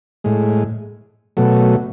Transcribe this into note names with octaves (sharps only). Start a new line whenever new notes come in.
A2 G#3
B2 F#3 A3